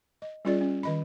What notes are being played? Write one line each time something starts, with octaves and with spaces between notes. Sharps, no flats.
D#5
G3 C#4 F4 G#4 D5
C#4
D#3 D#5 B5